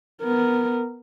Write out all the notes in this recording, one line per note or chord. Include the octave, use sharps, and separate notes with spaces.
B3 A#4